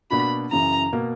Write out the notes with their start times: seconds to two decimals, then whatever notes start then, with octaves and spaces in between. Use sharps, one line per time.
0.11 B2 A#3 D4 F#4 B5
0.51 F#2 C#3 E3 A#5
0.93 B2 A#3